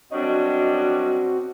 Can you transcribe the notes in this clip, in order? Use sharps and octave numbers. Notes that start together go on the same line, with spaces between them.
F#2 G3 C4 D4 F#4 C#5 D#5